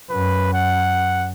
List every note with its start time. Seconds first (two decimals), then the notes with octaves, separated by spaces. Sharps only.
0.10 F#2 B4
0.54 F#5